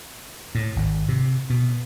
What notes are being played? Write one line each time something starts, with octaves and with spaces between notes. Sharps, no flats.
A2
G#1
C3
B2